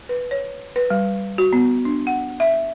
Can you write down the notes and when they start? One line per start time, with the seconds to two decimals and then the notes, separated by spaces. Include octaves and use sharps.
0.09 B4
0.31 C#5
0.76 B4
0.90 G3
1.38 F#4
1.53 B3
1.85 D4
2.07 F#5
2.40 E5